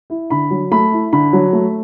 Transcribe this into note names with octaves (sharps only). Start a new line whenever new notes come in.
E4
D3 B5
F#3
A3 B5
E4
D3 B5
F#3
A3